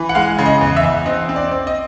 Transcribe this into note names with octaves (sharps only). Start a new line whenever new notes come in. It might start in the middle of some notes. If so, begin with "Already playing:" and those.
Already playing: E3
F#5
G#3 F5
C#3
D#5
E2
E5
E2
C4 D#5
C4
D5
C4
D#5